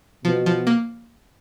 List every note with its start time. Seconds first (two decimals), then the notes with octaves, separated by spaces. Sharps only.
0.25 B2 F3
0.46 F3
0.67 A#3